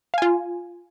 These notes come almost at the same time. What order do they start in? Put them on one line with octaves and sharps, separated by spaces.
F5 G#5 F4